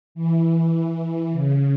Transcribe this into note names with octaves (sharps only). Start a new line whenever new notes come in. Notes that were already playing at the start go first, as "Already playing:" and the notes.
E3
C#3